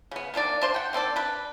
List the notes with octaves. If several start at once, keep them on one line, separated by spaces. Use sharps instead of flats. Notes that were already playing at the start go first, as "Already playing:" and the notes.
C#3 B3
D#3 A#3 D4 D5
D4 C5 C6
F#5 G5
D#3 C4 A4 D5
D4 B4